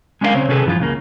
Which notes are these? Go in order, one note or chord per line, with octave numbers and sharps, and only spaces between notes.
G#3 C#4 D4 E4 A#4 F5
B1 C#3 C4 C#5
C3 C#4 G#4 A4 B4
G2 E3 F3 F4
C#2 C#3 A#3